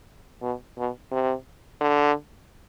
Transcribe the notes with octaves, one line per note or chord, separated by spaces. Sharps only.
B2
B2
C3
D3